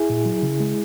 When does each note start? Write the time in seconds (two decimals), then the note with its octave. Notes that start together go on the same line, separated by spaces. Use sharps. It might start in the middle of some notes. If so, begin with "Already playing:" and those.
Already playing: E4 G#4
0.10 A#2
0.26 F#3
0.43 C#3
0.60 G#3